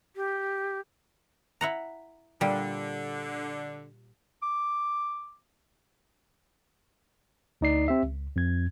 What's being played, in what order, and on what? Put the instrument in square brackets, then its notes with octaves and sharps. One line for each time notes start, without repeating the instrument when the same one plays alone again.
[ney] G4
[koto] E4 F#5 A#5
[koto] A#2 G3 [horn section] D3
[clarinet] D6
[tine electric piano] D2 D#4 D5 C7
C4 G4 E5
C#2
F2 G#6